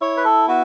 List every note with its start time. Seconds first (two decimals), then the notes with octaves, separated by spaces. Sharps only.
0.02 E4 C#5
0.17 B4
0.25 A4
0.49 B3 F#4